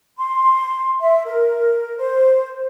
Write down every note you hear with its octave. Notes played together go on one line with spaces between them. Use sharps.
C6
E5
A#4
C5